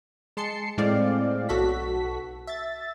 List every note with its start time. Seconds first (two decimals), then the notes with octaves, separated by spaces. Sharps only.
0.37 G#3 A5 C6 C7 C#7
0.78 A2 G#3 C4 D5 F5
1.49 B1 F#4 A4 B6
2.47 E5 A6